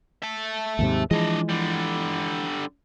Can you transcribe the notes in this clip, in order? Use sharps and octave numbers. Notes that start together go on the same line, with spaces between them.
E5 A5
D#2 G#2 C3
E3 F3 G#3 D4 D#5
D3 G3